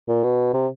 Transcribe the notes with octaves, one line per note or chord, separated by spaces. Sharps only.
A#2
B2
C3